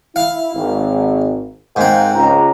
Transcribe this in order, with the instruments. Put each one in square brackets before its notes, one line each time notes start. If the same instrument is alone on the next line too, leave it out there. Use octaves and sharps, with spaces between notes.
[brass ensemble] E4 [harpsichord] F5
[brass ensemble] G#1
[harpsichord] G#2 C4 [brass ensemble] A#4 F5 F#5
[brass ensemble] C#2 A#5